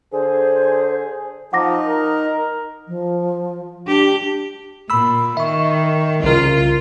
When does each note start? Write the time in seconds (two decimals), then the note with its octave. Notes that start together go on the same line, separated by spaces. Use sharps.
0.12 D3 G#4 C5
1.53 F3 D#4 F#5 D6 A#6
1.86 A#4
2.88 F3
3.87 D4 G4
4.90 A#2 B5 E6
5.37 D#3 E5 C#6
6.23 C2 C#3 F4 A#4